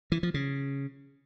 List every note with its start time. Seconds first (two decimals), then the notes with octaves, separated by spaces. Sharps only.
0.12 E3
0.23 F3
0.34 C#3